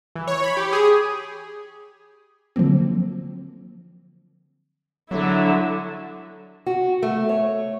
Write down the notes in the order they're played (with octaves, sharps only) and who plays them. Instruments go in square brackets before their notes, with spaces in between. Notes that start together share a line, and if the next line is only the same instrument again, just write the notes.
[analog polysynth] E3
C#5
B5
G4
G#4
[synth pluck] D3 F3 F#3 A#3 C4
[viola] D3 E4 [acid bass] F#3
[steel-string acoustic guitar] F#4
A3
C#5